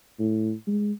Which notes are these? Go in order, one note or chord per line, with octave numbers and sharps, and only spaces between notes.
A2
G#3